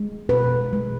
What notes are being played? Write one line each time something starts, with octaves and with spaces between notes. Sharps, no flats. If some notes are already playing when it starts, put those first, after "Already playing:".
Already playing: G#3
B2 B4
G#3